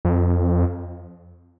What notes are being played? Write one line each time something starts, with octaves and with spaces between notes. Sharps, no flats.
F2